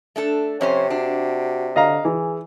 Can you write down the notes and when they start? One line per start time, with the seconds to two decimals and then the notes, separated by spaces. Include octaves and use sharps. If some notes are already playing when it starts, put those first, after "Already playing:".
0.16 A3 D4 A4
0.61 F2 C3 C#4 C5 C#5
0.90 D4 F#4
1.76 D3 D#5 F5 A#5
2.05 E3 G#4